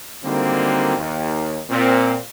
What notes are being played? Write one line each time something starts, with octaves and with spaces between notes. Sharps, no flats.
D3 D#3 F#3 G3 A#3 C4
D#2
A#2 C4